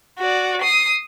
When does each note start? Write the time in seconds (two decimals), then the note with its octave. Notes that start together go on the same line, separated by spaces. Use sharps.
0.19 F#4 D5
0.62 D#6 C7